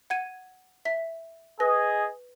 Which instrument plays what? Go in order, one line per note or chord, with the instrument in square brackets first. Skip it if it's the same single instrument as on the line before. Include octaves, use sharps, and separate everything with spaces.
[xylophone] F#5 G#6 D#7
E5 B6
[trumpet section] G#4 D#5 G#5 [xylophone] B4 A#6